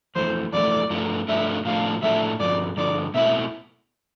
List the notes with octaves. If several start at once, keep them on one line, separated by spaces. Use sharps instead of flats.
F2 E3 A3 C5
F2 E3 A3 D5
G2 F3 A3 D4
G2 F3 A3 D4 E5
A2 F3 A3 D4 F5
A2 F3 A3 D4 E5
G2 D3 F3 D5
G2 D3 F3 D5
B2 A3 C4 E4 E5